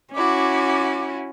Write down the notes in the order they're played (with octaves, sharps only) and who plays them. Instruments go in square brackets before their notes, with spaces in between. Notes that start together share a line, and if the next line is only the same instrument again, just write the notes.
[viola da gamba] C#4 [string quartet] E4 F#4 [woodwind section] D6